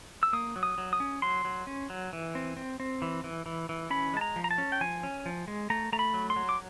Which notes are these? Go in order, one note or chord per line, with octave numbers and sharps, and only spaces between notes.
E6
A#3 D#6
F#3
D#6
F#3
D#6
C#4
F#3 C6
F#3
C#4
F#3
E3
C4
C4
C4
E3
E3
E3
E3
C#4 B5
G#3 A5
A#5
F3
A#5
A5
C#4
G5
F3 G#5
C#4
F3
G#3
A3 A#5
A3 A#5
B5
F#3
C6
F#3
D6